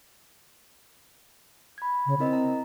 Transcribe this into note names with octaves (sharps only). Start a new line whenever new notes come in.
B5 G#6
C#3
C4 E4 A#4 D#5
A#5